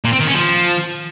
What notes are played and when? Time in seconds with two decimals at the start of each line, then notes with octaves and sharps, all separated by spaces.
0.04 A#2
0.12 C4
0.20 D#3
0.27 C#4
0.35 F3